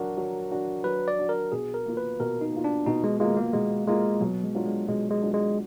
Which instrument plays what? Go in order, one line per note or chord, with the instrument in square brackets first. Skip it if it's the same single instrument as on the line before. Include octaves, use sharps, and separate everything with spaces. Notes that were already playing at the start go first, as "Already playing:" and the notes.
Already playing: [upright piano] F#3 D4 F#4 [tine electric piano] A#4
[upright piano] F#3
D4 F#4
[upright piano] F#3 [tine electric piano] B4
[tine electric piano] D5
[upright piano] D4 F#4
[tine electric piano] A#4
[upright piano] B2 [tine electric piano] G#4
[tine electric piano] A#4
[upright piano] A#3 F4
[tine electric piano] B4
[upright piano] B2 [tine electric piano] A#4
[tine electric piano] D#4
[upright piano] A#3 F4
[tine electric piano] D4
[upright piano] B2 [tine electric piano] D#4
[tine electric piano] G#3
[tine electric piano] G#3 [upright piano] A#3 F4
[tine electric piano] A#3
[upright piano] B2 [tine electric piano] G#3
[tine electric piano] G#3 [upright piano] A#3 F4
[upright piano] B2 [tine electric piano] F#3
[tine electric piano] G#3
[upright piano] F#3 D4 F4
[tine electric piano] G#3
[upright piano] B2 [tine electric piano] G#3
[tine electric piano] G#3
[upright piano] F#3 D4 F4
[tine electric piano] G#3